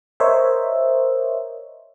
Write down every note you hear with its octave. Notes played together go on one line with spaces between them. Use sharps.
A#4 C5 C#5 D#5 E5